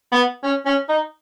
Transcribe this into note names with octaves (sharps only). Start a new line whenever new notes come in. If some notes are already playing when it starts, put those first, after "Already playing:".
B3
C#4
C#4
D#4